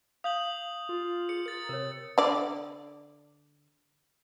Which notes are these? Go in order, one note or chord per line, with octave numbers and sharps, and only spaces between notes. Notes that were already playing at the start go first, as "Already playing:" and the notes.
F5 D#6 G6 F#7
F4
G#4 C#7
A#4 A6 C#7
C3 A#4 C#5
D3 D5